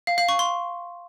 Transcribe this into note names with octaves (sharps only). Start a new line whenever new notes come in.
F5
F5
C#6
C6